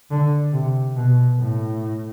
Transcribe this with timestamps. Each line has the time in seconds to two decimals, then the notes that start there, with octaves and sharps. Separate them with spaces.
0.11 D3
0.53 C3
0.96 B2
1.39 A2